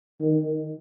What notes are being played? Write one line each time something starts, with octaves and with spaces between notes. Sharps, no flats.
D#3